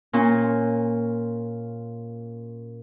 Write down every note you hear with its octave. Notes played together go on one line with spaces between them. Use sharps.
A#2 C#4